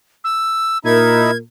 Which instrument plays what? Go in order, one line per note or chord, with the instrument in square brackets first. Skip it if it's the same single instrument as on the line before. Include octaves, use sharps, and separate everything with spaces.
[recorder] E6
[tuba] A#2 [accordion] D#4 E4 E5 [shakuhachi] A#4 [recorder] G#6